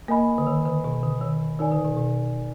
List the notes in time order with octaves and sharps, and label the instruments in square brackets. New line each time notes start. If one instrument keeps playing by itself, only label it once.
[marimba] A#3 [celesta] A#4 D#5 G#5 B5
[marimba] D3
D#3
D3
B2
D3
D#3
[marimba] D#3 [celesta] D#4 A#4 D5 G#5
[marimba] D3
B2
B2